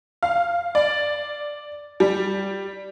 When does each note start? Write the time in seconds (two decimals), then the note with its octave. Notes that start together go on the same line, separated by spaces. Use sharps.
0.23 F5
0.75 D5
2.00 G3